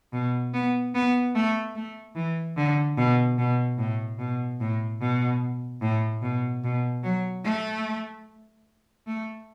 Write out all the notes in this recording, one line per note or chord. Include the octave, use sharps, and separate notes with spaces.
B2
B3
B3
A3
A3
E3
D3
B2
B2
A2
B2
A2
B2
A2
B2
B2
F#3
A3
A3